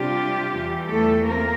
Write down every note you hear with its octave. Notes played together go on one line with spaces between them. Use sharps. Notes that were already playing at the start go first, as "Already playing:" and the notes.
Already playing: C3 G3 D4 F4 G4
E2 E3 G3
A3 A4
A#3 C4 F4 A#4